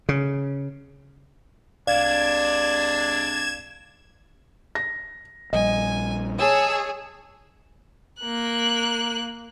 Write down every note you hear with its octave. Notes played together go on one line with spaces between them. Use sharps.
C#3
C2 C3 G#3 D4 D5 F5 G#6 E7
A#6
A#1 G3 D#5 G#5
G#4 C#5 A5 E6
A#3 F#6